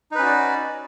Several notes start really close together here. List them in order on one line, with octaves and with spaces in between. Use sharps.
D#4 B4 C#4 F#4 D5